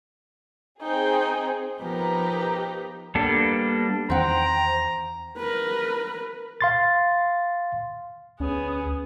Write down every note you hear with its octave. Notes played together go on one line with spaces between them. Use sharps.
C4 D#4 G#4 G5
F3 B3 D#4 G4 A#4 B4 A#5
G3 A#3 B3 D4 A4
E2 D#3 E3 C4 C5 F#5 G5 A#5
A#4 B4
F5 C6 A6
D2 B3 C#4 G#4